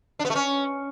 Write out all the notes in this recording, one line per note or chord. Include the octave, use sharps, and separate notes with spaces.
D4
B3
A3
C#4